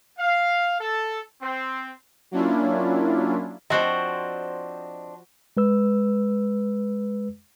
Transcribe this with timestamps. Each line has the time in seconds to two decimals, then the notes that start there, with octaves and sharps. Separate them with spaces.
0.18 F5
0.80 A4
1.42 C4
2.31 F#3 A#3 C#4 D4 E4 F4
3.70 F3 C4 D4 F#4 C5 D#5
5.57 G#3 B4 E6